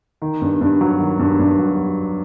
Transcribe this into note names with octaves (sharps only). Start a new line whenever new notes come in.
D#3
G2
G2
F#3
D#3
G2
G2
F#3